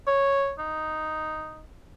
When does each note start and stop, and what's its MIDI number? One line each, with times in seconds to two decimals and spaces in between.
0.07 0.52 73
0.59 1.63 63